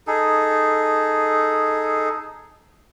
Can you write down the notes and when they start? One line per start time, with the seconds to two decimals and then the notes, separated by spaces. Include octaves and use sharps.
0.07 D#4 G#4 A4